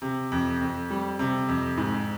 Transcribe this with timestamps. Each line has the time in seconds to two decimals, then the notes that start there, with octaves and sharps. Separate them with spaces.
0.02 C3
0.32 F2
0.61 F2
0.90 G3
1.19 C3
1.48 F2
1.77 G#2